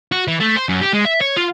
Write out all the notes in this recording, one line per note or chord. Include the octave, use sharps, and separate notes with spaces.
F#4
E3
A3
C5
F#2
G4
G#3
E5
C#5
F4